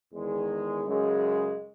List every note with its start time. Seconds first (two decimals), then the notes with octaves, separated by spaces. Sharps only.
0.13 E2 D#3 G#3
0.86 F#2 C#3 G#3